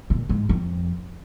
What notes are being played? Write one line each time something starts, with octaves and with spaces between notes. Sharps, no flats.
A#2
G#2
F2